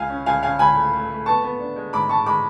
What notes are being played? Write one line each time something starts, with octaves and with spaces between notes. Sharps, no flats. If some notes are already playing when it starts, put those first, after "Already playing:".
Already playing: C#2 F5 G#5
C#4
C#2 F5 G#5
C#4 F5 G#5
C#2 G#5 B5
A3
A3
A3
B3 A5 C#6
B3
D4
G#3
G#2 B5 D6
G#2 A5 C#6
G#3 B5 D6